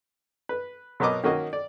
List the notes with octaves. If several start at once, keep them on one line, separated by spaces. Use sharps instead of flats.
B4
B2 F#3 B3 A#4 D#5 D6
D#3 A#3 C#4 F#4 D#5
D5